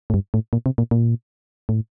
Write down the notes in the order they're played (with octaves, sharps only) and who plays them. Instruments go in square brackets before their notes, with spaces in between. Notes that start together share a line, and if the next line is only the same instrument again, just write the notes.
[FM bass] A2
G2
A2
A#2
C3
A#2
A#2
A2